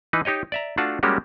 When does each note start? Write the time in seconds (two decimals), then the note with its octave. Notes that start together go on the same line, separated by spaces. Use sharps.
0.13 E3 D#4 B4
0.25 D#4 G4 C#5 D#5
0.52 D5 E5 A#5
0.77 A3 D4 F4 F#4 F#5 A5
1.03 G3 G#3 A#3 C#4 F#4 G4